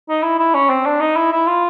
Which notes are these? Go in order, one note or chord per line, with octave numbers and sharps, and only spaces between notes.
D#4
E4
E4
C#4
C4
D4
D#4
E4
E4
F4